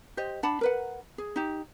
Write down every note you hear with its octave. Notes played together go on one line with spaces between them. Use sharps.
G4 C5 D#5
D4 F#5 A5 B5
A#4 B4 F#5
G#4
D#4 G4